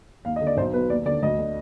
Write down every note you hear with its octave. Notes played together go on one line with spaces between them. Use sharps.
D#2 F5
D#5
D3
D5
B1 C5
B2 B4
D#2 D5
D3 D5
D2 D#5
D3